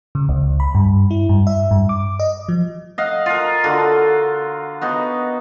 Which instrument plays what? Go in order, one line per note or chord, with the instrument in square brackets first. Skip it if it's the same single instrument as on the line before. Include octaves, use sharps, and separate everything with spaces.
[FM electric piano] C#3
C#2
B5
G2
E4
G2
E5
G2
D6
D#5
F3
[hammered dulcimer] D#5 F5 F#5
F4 A#4
D3 F4 F#4
B3 D#4 F#4